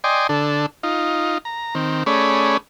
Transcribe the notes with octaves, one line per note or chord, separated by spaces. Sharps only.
D5 D#5 G5 G#5 C6
D3 D4 A4
D#4 F4
A#5
D#3 C4
A3 C#4 G#4 C#5 D5 B5